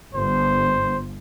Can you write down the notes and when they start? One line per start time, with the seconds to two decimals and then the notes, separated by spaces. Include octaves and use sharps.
0.15 G1 C5